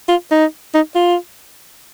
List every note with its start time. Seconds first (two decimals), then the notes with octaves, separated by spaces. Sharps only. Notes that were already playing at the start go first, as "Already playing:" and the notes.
0.09 F4
0.32 D#4
0.74 D#4
0.95 F4